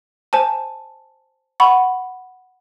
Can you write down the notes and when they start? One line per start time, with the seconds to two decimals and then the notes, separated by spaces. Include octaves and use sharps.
0.33 C5 G#5 A5
1.60 F#5 B5 C#6